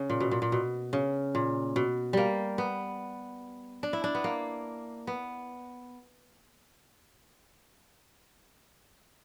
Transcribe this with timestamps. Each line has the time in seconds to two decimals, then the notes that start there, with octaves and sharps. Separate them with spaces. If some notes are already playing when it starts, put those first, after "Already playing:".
Already playing: C#3
0.10 A#2
0.20 B2
0.31 A#2
0.42 A#2
0.52 B2
0.93 C#3
1.35 A#2
1.76 B2
2.13 G3 A#3
2.58 B3
3.83 D4
3.93 E4
4.04 D4
4.15 B3
4.24 A#3
5.07 B3